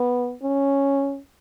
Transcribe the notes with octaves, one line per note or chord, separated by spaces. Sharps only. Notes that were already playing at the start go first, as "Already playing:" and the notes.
Already playing: B3
C#4